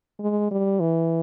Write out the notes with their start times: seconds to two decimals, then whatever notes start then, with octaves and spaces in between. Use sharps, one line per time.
0.20 G#3
0.51 G3
0.80 E3